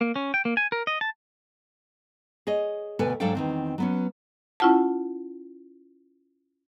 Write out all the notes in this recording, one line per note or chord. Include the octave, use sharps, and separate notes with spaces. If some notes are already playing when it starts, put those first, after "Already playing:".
A#3
C#4
G5
A#3
G#5
A#4
D#5
A5
G#4 C#5 D#5
D2 B2 A4 B4 G#5
G#2 F#3 D4 A4 F5 G5
E2 D#3 C4
F#3 B3 C#4
C#4 E4 F4 F#5 A5